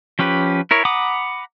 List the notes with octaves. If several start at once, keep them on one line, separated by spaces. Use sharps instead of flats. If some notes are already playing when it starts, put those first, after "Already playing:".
F3 C#4 G4 B4
E4 A#4 C#5
F#5 A#5 B5 D6 D#6